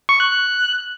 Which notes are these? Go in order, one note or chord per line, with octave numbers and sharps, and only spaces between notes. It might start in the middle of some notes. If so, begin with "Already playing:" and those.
C#6
F#6
F#6